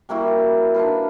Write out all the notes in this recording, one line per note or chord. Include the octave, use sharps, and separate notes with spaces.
G3 A#3 E4 F#4
D4 D#4 F4 B4